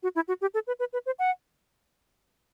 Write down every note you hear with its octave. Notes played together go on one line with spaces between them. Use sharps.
F#4
E4
F#4
G4
A4
B4
B4
B4
C5
F#5